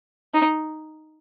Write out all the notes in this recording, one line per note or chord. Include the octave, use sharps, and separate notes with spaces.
D#4